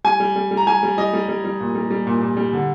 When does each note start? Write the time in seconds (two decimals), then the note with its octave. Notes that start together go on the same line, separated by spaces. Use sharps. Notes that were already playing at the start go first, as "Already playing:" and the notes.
0.04 G3 G#5
0.20 G3
0.36 G3
0.51 G3
0.57 A#5
0.67 G3 G#5
0.83 G3
0.98 G3 D#5
1.14 G3
1.29 G3
1.44 G3
1.60 A#2
1.75 G3
1.90 G3
2.07 A#2
2.21 A#2
2.37 G3
2.53 D3